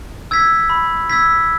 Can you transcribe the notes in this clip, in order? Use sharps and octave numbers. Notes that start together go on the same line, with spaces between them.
E6 G#6 B6
B5
E6 G#6 B6